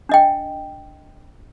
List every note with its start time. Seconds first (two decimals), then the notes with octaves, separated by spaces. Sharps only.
0.09 D4 D#5 G5